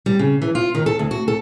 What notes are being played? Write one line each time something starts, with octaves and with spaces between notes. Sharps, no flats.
G3
C#3
E3
F4
D#3
A4
D2
F#4
A4